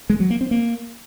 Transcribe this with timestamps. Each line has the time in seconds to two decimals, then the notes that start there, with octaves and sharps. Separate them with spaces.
0.10 G#3
0.20 F#3
0.30 A#3
0.41 C4
0.51 A#3